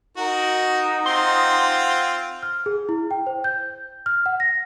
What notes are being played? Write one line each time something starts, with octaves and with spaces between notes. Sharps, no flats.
D#4 F#4 A#4 F#5
C4 F4 C6
F6
G#4
E4
G5
C5
G6
F6
F#5
A#6